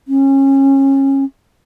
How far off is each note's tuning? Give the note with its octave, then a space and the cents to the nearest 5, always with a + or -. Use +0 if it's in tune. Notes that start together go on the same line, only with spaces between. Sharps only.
C#4 -25